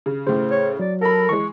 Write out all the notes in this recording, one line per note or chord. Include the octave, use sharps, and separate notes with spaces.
C#3
A2 C#3 C5
C#5
F#3 D5
A4 A#4 B5
E3 G#3 C#6